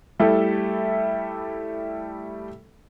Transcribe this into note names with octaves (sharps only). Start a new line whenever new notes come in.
G3 A3 E4 G4 A4